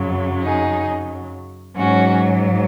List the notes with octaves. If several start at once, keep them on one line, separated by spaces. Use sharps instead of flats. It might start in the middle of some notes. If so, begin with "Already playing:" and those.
Already playing: F#2 C#3 F#3
D#4 G#4
G#2 F#3 C#4 F#4